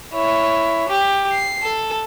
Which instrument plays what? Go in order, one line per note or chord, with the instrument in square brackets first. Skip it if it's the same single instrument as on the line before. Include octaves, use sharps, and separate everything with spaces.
[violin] E4 C#5
G4
C7
A4